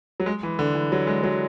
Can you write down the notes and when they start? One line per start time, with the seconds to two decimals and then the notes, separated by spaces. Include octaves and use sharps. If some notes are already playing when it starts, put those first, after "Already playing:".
0.20 F#3
0.26 G#3
0.43 E3
0.59 D3
0.75 E3
0.92 F#3
1.07 G#3
1.24 F#3